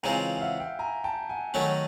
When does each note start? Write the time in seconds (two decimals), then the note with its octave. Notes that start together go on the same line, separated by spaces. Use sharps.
0.03 C#3 E3 G#3 C4 F4 G#5 A#5
0.37 F5
0.41 E5 F#5
0.60 F5 G5
0.79 G#5 A#5
1.04 G5 A5
1.29 F#5 G#5
1.54 D#3 F#3 A3 C#4